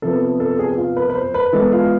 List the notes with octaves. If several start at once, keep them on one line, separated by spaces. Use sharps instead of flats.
C3 F3 B3 A4
A4
G#4
G#4
F4
B4
B4
C5
B4
E3 G#3 B3 A4
F4